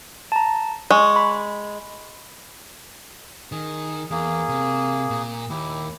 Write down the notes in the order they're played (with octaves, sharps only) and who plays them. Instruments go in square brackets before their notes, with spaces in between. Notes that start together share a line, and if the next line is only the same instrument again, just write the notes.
[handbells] A5 A#5
[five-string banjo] G#3 [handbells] C#6
[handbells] B5
[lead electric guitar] D#3 [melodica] G#4
[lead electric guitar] E2 [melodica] A#3 G#4
[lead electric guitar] C3
A#2
[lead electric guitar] D#2 [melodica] E4 G4